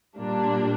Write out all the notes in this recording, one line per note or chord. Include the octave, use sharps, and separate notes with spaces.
A#2 G3 A#3 D4